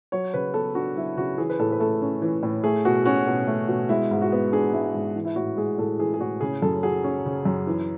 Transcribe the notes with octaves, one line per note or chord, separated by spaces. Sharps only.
F#3 C#5
C#3 B4
B3 A4
D4 F#4
F#3 E4
C#3 F#4
E3 G#4
B4
A2 A4
B4
A3 A4
C#4
E3
A2
A3 G#4
B2 F#4
C#4 F#4
B2
A3
B2
G#3 E4
G#2
F#4
B3
D4 G#4
G#3 E4
G#2
E3
E4
A2 F#4
G#3 G#4
A2 A4
E3 G#4
G#4
A2 F#4
C#3 G#4
F#2 A4
F#3 G#4
C#4
C#3
F#2
E3